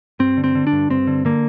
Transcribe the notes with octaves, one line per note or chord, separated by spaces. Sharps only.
G2 C4
D3
C4
D3
D4
G2
G2 C4
D3
D3 A#3